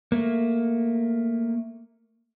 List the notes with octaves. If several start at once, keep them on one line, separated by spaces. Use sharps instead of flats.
A3 A#3